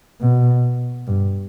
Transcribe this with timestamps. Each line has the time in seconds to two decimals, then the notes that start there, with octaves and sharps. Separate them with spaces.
0.20 B2
1.07 G2